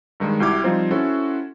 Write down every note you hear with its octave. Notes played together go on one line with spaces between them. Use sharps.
G2 D#3 G#3
C2 E4 F#4 G4 D6 G#6
F3 G3 C4 D#4 F4 C5
C#4 E4 F#4 A4 C5